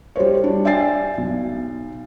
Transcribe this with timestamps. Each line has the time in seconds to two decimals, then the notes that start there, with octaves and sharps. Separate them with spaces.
0.16 G3 F#4 C5 C#5
0.44 D4
0.65 D5 E5 G5 G#5 A6 C7
1.18 B1